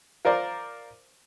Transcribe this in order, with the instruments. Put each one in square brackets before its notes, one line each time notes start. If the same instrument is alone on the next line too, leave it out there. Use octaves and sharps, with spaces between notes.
[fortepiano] F4 A#4 C5 D5